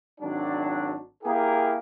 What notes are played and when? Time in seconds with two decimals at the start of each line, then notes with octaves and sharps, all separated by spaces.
0.20 G#1 F#3 D4
1.24 A#3 E4 G4 G#4 A#4